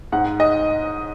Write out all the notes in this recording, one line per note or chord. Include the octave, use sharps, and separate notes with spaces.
G#2 F#5
D#5